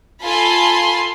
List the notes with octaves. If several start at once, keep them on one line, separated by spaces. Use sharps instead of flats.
F4 A4 G#5 A5 B5 C6